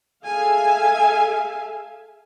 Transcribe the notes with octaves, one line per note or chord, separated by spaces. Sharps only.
G#4 A4 E5 F5 G#5